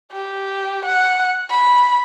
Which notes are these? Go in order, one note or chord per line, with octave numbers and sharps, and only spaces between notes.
G4
F#5
B5